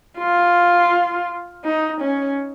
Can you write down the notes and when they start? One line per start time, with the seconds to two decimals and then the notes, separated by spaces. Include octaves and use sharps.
0.19 F4
1.64 D#4
2.01 C#4